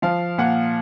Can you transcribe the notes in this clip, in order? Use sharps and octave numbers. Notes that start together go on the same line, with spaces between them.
F3 F5
A#2 F#5